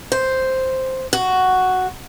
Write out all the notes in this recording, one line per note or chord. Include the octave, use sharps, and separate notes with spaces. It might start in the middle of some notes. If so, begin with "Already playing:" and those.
C5
F#4